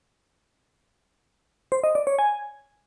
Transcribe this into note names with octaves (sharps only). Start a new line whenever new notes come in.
C5
D#5
D5
C#5
G#5